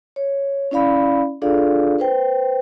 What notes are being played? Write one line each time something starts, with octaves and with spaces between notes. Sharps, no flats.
C#5
C#4 E4 D5 F5 B5
D4 F4 G#4 A4 D5 F5
B4 C5 G5